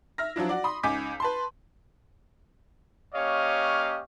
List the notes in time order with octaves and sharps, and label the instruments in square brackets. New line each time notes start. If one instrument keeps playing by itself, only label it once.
[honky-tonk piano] E5 F6 A#6
F3 F#3 D4 E4
F#4 D5
B5 C6 D#6
C#2 D#4 G#5 D6 G6 B6
B4 A5 C6
[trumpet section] A#3 C#4 G4 C#5 D#5 F5